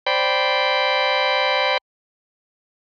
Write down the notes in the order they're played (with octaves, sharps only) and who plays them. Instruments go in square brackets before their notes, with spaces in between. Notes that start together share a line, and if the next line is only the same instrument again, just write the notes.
[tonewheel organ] C5 D5 G5 B5